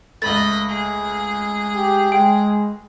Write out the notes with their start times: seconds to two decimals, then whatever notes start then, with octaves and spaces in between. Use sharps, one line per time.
0.22 C#2 A3 D#5 B5 A6
0.69 G#4
1.75 G4
2.12 G#3 G5